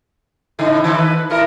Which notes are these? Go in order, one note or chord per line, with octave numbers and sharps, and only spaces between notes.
A2 C#3 D#4
D#3 E4
B4
A2 E4 A#4